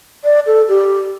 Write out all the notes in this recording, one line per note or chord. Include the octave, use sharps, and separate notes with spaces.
D5
A4
G4